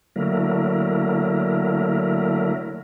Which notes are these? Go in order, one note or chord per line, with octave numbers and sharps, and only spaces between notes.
D3 F#3 A3 A#3 E4 A#4